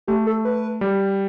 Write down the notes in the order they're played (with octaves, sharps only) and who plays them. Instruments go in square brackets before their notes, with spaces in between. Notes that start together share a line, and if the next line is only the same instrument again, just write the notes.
[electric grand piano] A3 [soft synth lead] G4
[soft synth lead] A4
B4
[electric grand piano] G3